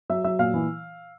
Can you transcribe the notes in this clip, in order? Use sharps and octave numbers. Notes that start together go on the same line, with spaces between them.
F#3 E5 E6
F#3 E5 E6
A#2 F5 F6
E3